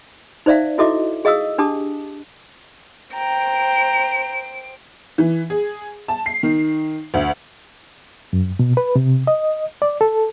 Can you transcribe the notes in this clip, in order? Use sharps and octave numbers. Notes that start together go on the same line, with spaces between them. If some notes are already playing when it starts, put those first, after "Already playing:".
D#4 C5 D5 E5 F5
E4 F#4 A4 D#5 E5 D6
G#4 D#5 F5 D#6 E6
D4 G4 A5 D6 D#6
C5 G5 A#5 D7
E3
G#4
A5
C7
D#3
D2
F#2
B2
B4
C3
D#5
D5
A4